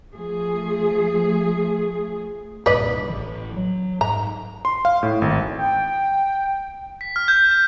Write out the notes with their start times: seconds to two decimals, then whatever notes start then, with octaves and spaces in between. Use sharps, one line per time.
0.15 F3 A3 G#4
2.66 C2 G2 A#2 B4 D5 D#5
3.09 A1 E3
3.56 F#3
4.01 G#2 A#5
4.65 C6
4.85 F5
5.03 A2
5.22 G#1
5.59 G5
7.01 B6
7.16 F6
7.28 G6
7.51 G6